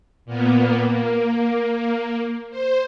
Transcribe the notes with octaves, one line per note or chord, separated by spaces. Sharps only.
A#2 A#3 B3
A#3
C5